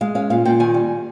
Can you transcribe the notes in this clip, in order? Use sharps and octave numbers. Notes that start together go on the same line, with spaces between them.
G#3 F5
C#4 F5
A#2 F5
A#2 G5
D#3 G#5
G3